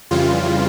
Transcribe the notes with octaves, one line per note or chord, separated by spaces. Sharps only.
F2 C#3 E3 G3 F4